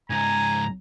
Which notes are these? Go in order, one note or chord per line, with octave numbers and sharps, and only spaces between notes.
C#2 G#2 G#5 A#5